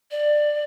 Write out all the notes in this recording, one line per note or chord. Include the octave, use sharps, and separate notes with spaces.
D5